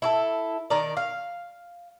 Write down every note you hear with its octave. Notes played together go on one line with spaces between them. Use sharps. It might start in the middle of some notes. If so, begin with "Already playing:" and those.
E4 F#4 A4
D#3 A#4 D5
F5